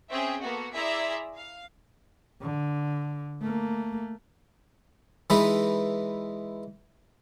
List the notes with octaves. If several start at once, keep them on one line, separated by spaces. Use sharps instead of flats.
C4 C#4 G#4 E5 G5
A#3 B3 F#4 A4
E4 G#4 D5 E5 A#5 C6
F5
D3
A3 A#3
E3 G#3 D#4 B4